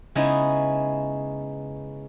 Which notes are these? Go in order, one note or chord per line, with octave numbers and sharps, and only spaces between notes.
C#3 G#3 B3 C#4 D#4 E4